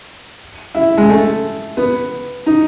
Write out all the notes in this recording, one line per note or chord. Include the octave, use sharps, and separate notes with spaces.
E4
G#3
A3
B3
D#4